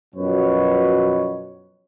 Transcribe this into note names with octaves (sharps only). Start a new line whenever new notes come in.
F#2 B2 F3 B4 C#5